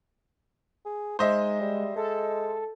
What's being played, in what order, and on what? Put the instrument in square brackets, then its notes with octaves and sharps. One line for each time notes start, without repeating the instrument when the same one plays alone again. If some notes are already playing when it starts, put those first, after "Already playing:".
[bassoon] G#4
[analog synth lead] G#3 [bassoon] D#4 [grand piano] C5 D#5 E5
[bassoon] G3
[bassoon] G#3 [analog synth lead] A4